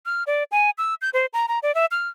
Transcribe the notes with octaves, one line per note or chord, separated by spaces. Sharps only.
F6
D5
G#5
E6
G6
C5
A#5
A#5
D5
E5
F6